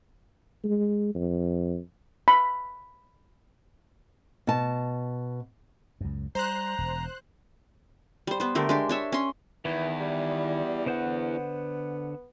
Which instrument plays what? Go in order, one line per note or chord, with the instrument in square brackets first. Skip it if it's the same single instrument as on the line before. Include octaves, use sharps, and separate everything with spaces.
[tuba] G#3
F2
[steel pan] B5
[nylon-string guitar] B2 A5
[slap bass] C#2 F#2
[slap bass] G3 [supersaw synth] C5 F#6 [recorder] A#5
[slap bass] E1
[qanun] G3 C5
B3 C5
D3 A3 G4 A#4
G#3 D4 G4
D4 C#5 E5
C#4 C6
[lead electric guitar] E2 [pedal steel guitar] D#3 E4 [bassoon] E3
[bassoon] G3
[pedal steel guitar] D3 C5 F#5 [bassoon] B3